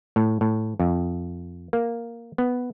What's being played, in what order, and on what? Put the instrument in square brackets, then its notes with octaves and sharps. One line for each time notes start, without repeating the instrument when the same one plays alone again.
[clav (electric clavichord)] A2
A2
F2
A#3
B3